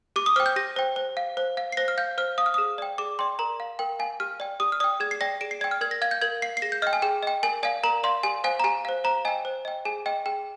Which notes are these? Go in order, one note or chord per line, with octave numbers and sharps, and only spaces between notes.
G4 D6
D#6
C5 G5 F6
G6
G4 A#6
C5 G5
C5
F5
C5
F5
C7
C5 A#6
F6
F5 G6
C5 F6
F5 D#6
F6
G#4 D#6
D5 G5
G#4 D6
D5 G5 C6
A#4 A#5
F5
A#4 G5
F5 G#5
G4 F6
D5 G5
G4 D#6
F6
D5 G5 D#6
G#4 G#6
C7
D5 G5 A#6
G#4 D7
C7
D5 G5 G#6
F6
A#4 G#6
A#6
F5 G#6
G6
A#4 G#6
F5 C7
C7
G#4 A#6
G6
D#5 G5 F6
G#5
G#4 G5
D#5 G5
A#4 G#5
D5 F5 G#5
A#4 A#5
D5 F5 C6
G4 G#5
C5 F5 G#5
A#5
G4 G#5
C5 F5
C5 A#5
D#5 G5 G#5
C5
D#5 G5
G#4 G#5
D#5 G5
G#4 G5